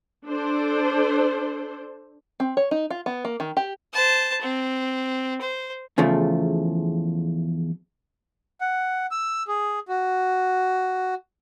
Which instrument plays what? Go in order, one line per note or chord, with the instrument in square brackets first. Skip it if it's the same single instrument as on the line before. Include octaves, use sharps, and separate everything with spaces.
[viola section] D4 A4 C5
[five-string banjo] C4
C#5
D#4
F4
B3
A#3
D#3
G4
[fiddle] C5 A5
C4
C5
[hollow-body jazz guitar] E2 C#3 F3 A3
[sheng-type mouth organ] F#5
E6
G#4
F#4